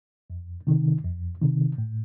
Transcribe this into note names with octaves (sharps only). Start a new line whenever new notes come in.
F2
C3 D#3
F2
C3 D#3
A2